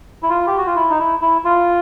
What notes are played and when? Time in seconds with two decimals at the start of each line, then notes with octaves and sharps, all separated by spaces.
0.23 E4
0.30 F4
0.47 G4
0.58 F#4
0.66 F4
0.76 E4
0.90 D#4
0.99 E4
1.21 E4
1.45 F4